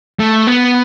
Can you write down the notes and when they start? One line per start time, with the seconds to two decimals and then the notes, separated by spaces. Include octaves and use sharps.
0.19 A3
0.47 B3